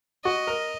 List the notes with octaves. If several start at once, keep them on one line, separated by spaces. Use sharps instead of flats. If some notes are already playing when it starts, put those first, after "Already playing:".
F#4 D#5
A#4